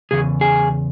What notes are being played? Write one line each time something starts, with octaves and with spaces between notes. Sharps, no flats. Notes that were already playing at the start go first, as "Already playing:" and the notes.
E2 C#3 G#4
G#4